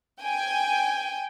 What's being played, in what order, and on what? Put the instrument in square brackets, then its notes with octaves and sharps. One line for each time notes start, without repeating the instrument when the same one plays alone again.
[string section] G5 G#5